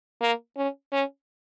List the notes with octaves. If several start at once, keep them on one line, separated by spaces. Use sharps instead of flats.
A#3
C#4
C#4